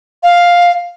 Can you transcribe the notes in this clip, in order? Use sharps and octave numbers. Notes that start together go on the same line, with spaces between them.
F5